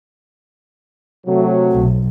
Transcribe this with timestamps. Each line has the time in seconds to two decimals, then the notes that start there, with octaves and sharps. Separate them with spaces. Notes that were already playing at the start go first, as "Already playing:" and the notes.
1.27 C3 F#3 A3
1.72 B1